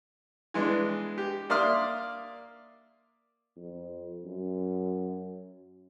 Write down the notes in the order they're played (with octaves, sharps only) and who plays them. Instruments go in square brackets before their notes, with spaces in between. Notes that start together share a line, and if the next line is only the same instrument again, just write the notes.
[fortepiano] E3 G#3 B3 D4
G4
A#3 D5 E5 C6 D#6 F6
[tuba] F2
F#2